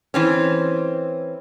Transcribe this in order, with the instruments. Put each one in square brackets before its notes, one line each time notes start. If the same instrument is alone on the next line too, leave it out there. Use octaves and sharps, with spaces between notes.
[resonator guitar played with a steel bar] E3 C4 C#4